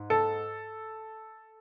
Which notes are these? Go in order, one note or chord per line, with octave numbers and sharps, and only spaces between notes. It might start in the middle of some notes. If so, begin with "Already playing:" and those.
Already playing: G#2
A4